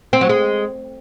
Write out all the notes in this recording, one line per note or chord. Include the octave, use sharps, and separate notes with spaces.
C4
F#3
G#3